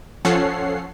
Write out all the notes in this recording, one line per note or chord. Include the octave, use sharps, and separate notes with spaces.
F3 C#4 A4 C#5 F#5 C7